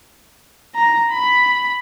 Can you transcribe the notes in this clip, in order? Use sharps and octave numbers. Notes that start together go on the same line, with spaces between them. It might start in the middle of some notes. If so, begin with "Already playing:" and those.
A#5
B5